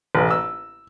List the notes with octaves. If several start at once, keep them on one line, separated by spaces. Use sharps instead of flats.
A1
E6